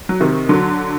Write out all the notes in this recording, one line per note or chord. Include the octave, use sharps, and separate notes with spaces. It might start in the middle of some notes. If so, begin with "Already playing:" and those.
F#3
C3 D#3
D3 F#3